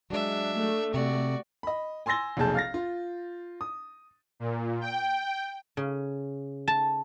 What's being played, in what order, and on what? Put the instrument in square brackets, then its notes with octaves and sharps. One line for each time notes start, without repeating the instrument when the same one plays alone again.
[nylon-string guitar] F#3 G#3 [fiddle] D4 E5
[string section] A3
[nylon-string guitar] C3 [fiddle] F#4 D5
[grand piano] D#5 B5
G#5 C6 E6 A6 A#6 G7
F1 B1 A#2 G#4 A5 G6
F5 F6 A6 A#6
F4
D#6
[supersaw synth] A#2
G5
[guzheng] C#3
A5